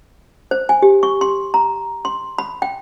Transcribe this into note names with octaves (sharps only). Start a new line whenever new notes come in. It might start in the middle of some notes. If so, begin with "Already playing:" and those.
C5
G#5
G4
C#6
C6
A#5
C6
B5
G5